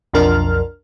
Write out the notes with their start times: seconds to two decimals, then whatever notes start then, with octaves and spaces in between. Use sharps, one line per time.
0.13 B1 F2 F3 D4 A#4 F6